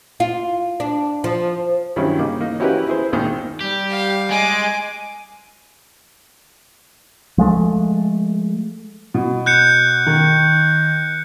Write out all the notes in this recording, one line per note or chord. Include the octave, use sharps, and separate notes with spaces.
F4
D4
F3
G2 D#3 F#3 C#4 E4
C#3 A#3 D#4 D6
A#3 D#4
C#4 E4 F#4 G4 A#4 B4
E4 G#4 C5
G#1 A#2 D#3
G3 G4
F5
G#3 G#5 D6
F3 G#3 A3
B2
F#6 G6 C#7
D#3